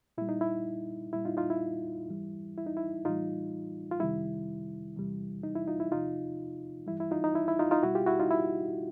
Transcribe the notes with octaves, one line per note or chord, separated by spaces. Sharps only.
A#2 G3 E4
D#4
E4
A#2 G3 E4
D#4 F4
D#4 F4
E4
G#2 E3 G3
E4
D#4
E4
A2 E3 G3 D#4 F4
F4
F2 C3 D#3 G3 E4
E2 C3 E3 G3
D#4
E4
D#4 F4
E4
E2 C3 F3 D#4 F4
G2 E3 G3 E4
E4
D#4 F4
D#4
E4
E4
D#4 F4
D#4 F4
B2 G3 E4 F#4
F4 G4
E4 F#4
D#4 F4
E4